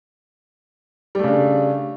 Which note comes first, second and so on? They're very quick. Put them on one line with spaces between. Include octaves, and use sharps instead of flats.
G3 A3 C#3 D4